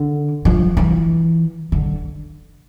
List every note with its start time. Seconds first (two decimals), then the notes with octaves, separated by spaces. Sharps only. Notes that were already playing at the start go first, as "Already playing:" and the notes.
Already playing: D3
0.45 F3
0.77 E3
1.72 D3